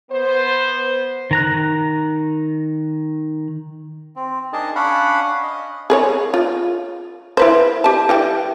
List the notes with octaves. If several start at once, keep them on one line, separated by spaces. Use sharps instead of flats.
B3 C5
D#3 A#5 F#6
C4
D4 D#4 G#4 A#4 D#5 A5
C#4 D4 F5 F#5 B5
D#5
G#4 B4 C#5
F4
E4 B4 C5
G4 A5
E3 G4 G5